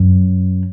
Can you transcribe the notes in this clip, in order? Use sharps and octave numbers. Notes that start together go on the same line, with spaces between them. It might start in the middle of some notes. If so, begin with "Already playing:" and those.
Already playing: F#2